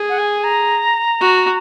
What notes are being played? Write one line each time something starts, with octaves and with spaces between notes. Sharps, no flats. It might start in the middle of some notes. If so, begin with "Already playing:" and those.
Already playing: G#4
F#5
G#5
A#5
F#4